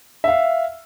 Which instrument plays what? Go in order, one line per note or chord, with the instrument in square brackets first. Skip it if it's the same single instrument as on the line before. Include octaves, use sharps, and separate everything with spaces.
[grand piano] E5 F5